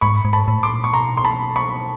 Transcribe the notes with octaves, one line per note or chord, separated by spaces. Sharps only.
G#2 B5 C#6
G#2
A5 B5
A2
C6 D6
A#2
C#6
B2 A#5 C6
C6
A5 B5
B5 C#6